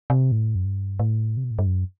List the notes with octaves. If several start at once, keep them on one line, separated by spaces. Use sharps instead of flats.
C3
A2
F#2
G2
A2
C3
B2
A2
G2
F#2